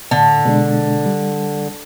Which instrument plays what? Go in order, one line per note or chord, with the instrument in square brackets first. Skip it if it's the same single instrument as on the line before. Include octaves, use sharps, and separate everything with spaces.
[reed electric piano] A2 [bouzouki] D3
[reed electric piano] B2 G#3 D4
G3